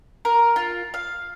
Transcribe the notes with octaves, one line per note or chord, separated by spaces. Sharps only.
A#4
F4
F5